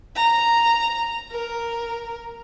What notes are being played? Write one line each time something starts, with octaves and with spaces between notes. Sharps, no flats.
A#5
A#4